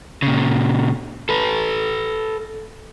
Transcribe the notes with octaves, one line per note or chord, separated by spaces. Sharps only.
A#2 C#3
A4 B4